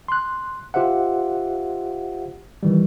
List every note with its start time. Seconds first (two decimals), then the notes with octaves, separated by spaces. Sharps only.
0.08 C6 F#6
0.74 F4 G4 C5 E5 F#5
2.63 D#3 E3 G3